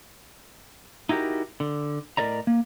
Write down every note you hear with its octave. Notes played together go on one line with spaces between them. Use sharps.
D#4 E4 F#4 G4 A#4
D3
A2 A#4 D5 D#5 A#5
A#3